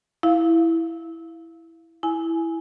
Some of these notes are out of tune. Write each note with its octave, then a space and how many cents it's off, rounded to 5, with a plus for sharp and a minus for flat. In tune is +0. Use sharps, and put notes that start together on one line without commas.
E4 +0 F5 -5
E4 +0 G#5 +10